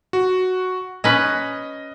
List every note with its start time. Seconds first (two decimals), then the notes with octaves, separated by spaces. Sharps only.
0.13 F#4
1.04 C#4 B4 D#5